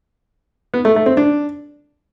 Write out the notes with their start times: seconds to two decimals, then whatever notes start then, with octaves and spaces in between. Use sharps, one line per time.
0.74 B3
0.85 A3
0.96 A3
1.06 C4
1.17 D4